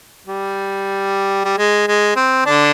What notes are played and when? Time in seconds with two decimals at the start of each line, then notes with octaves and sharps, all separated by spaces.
0.27 G3
1.45 G3
1.58 G#3
1.88 G#3
2.16 C4
2.46 D3 D4